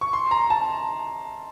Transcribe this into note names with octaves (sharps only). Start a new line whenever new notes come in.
C#6
C6
A#5
A5